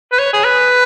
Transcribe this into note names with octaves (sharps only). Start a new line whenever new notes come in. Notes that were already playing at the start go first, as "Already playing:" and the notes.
B4
C#5
G#4
B4